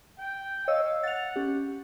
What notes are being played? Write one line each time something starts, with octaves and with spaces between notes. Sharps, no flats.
G5
C#5 D#5 F5 E6
F#5 A6 F7
C#4 G4